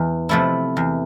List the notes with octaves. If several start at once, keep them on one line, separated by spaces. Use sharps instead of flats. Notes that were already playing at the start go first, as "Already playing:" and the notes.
Already playing: E2
C3 F3 A3 E4
E2